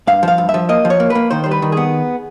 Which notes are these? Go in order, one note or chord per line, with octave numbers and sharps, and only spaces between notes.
G2 F5
F3 F5
G2
E5
F3
A#3 D#5
F3
C#5
A#3
B4
A#3
D#3 C5
G3 C5
B4
D#3
B3 G#4